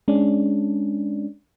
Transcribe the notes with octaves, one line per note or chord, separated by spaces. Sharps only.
G#3 C#4 D4